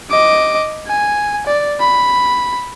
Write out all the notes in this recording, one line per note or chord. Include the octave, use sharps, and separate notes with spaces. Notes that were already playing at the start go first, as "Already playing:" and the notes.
D#5 D6
G#5
D5
B5